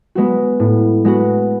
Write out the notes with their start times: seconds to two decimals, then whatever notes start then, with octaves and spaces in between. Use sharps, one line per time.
0.15 G#3 B3 F#4
0.60 A2
1.05 G#3 B3 F#4